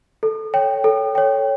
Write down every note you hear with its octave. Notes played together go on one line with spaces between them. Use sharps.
A4
C#5 G5
A4
C#5 G5